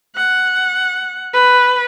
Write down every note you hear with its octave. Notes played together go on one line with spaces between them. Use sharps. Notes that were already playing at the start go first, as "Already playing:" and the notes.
F#5
B4